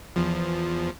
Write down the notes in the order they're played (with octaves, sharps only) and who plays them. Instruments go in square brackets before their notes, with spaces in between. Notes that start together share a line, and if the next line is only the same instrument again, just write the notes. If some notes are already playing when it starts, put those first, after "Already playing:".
[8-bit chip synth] E2 F3